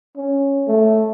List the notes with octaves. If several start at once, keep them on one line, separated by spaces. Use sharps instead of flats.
C#4
A3